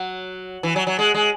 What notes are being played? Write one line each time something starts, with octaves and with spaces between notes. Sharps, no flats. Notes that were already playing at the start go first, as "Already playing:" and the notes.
Already playing: F#3
E3
F#3
F#3
G#3
G#3